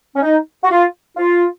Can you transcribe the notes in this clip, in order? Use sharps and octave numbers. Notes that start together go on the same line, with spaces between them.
C#4
D#4
F#4
F4
F4